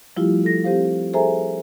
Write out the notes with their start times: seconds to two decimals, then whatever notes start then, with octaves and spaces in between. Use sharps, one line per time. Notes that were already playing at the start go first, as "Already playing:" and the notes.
0.17 F3 G3 A3 E4 F4 G4
0.44 A4 A#6
0.64 C4 G4 C5 F5
1.13 G#4 A4 C5 E5 G#5 A#5